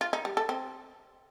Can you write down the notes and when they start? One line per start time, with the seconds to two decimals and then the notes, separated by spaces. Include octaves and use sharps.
0.01 F4
0.13 D#4
0.25 G3
0.37 A4
0.49 C4